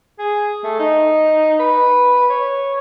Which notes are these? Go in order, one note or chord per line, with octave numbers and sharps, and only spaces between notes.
G#4
A3
D#4
B4
C#5